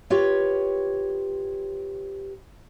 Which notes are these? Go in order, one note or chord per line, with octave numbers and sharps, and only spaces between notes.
F4 G4 B4 C#5